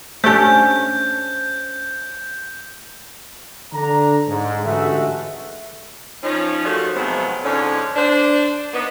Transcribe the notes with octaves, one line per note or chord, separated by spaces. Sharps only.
A3 C#4 D4 G4 C5 A5 G6
D3 D4 A#5
G#2
A1 D3 G#3 A3 F#4 E5
F3 C#4 D#4
D#3 F3 G3 A3 F#4
A2 C3 F3 F#3 G#3 B3
F2 G#2 D3 C#4
D4 C5
A#3 B3 D#4